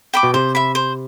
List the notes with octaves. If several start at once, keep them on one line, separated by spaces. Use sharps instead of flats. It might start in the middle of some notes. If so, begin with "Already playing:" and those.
G5 B5 D6
B2
C3 C5
E5 B5
C5